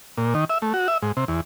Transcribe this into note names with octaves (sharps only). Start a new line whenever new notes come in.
A#2
D#3
E5
A3
F#4
E5
G#2
C3
E2